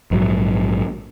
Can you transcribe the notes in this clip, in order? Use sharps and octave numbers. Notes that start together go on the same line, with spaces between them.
A#1 G#2 F#3